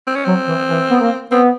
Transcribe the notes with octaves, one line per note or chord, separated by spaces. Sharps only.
C4
C#4
F#3 C4
E3
E3
B3
A#3
B3 C4